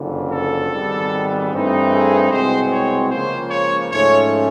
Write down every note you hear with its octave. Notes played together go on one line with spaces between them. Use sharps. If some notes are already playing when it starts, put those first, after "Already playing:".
Already playing: F#1 F2 D3
A4
G#1 G#2 D#3 G3 B3
G2 E3 A3 C4 D#4
G#4
C2 B2 G#3 C4 C5
C#5
C#2 C#3 F3 A#3 C5
C#5
G#2 F3 A3 C#4 C#5